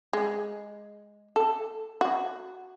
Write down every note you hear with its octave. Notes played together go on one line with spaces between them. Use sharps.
G#3
A4
F#4